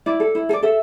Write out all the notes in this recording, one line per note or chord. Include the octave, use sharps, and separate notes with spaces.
E4 D5
A4
E4
A4
D5
A4 E5